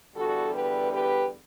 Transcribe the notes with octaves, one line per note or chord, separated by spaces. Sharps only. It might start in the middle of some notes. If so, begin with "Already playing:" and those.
E2 D3 G3 B3 F#4 A4
G4 B4
G4 B4